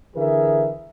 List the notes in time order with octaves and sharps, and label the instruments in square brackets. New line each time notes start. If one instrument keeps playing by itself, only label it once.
[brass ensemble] D3 E3 G#4 A#4 E5